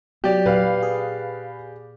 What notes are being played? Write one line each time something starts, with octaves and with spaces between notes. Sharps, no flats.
F#3 B3 G4 D5
A#2 B4 F5
G#4